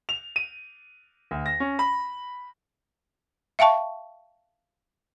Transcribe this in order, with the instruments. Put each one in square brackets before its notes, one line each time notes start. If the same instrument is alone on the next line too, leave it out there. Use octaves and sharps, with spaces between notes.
[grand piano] F7
D#7
D2
A#6
C#4
B5
[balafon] E5 F5 G5 A5 C#6